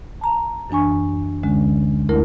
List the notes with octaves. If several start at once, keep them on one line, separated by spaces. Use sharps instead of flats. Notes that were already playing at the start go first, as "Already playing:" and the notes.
A5 A#5
F#2 E3 D4 G#5 C#6
D2 D3 G#3 C#4
D2 A3 E4 A#4